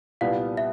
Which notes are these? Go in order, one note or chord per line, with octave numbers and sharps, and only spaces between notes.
C2 A#2 G3 B3 F5
E5